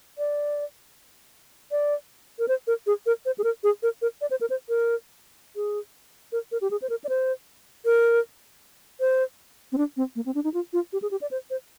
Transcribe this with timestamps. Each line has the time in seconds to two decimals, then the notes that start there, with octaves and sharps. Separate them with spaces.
0.18 D5
1.71 D5
2.39 A#4
2.48 C5
2.67 A#4
2.87 G#4
3.06 A#4
3.25 C5
3.38 G#4
3.44 A#4
3.63 G#4
3.83 A#4
4.02 A#4
4.21 D5
4.31 C5
4.41 A#4
4.50 C5
4.69 A#4
5.56 G#4
6.32 A#4
6.52 A#4
6.61 G4
6.71 G#4
6.82 C5
6.90 A#4
7.04 D5
7.09 C5
7.85 A#4
9.00 C5
9.72 C4
9.78 D4
9.97 C4
10.16 A#3
10.26 C4
10.35 D4
10.44 D#4
10.54 F4
10.73 F4
10.93 G4
11.02 G#4
11.11 G4
11.21 D5
11.31 C5
11.50 C5